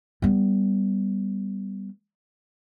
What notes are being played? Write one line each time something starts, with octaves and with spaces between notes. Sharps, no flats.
G3 B3